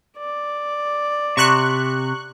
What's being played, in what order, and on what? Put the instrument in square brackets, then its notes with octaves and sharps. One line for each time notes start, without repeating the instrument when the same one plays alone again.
[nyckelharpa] D5
[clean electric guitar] C3 [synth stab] C#6 F#6